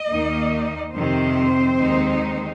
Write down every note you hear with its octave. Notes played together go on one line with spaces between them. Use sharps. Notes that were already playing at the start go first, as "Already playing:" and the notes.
Already playing: D#5
D#2 D#3 A#3 D#4
F2 C3 D#3 C4 C5
D#2 D#3 G#3 D#4